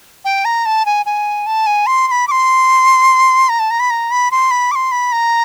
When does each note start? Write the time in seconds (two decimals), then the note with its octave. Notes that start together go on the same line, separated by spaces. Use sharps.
0.25 G5
0.45 A#5
0.66 A5
0.86 G#5
1.06 G#5
1.46 A5
1.66 G#5
1.86 C6
2.07 C6
2.11 B5
2.27 D6
2.31 C6
3.49 A#5
3.59 A5
3.70 A#5
3.80 B5
3.90 A#5
4.11 B5
4.31 C6
4.51 B5
4.71 D6
4.75 C6
4.92 B5
5.12 A#5